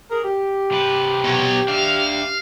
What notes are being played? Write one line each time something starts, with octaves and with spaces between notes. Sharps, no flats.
G#4 A#4
G4
C3 B4
B2 C#5
D4 E5 F5